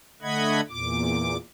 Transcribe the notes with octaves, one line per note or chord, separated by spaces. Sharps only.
D3 A3 D#5 F#5 B5 G#6
E2 A#2 D6